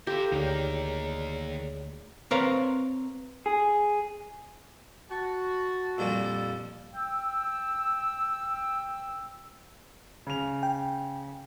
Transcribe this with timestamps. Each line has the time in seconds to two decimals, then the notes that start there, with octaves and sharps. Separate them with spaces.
0.07 G4 A4 A#4 C5 F5 E6
0.32 D2 D#3 A#3 D#4 G#4 C#5 D5
2.31 C4 A#4 B4 C#5 F5 A#5
3.46 G#4
5.11 F#4 A5
5.98 F2 A#2 G3 E6
6.94 G5 E6
10.27 C#3 F7
10.63 G5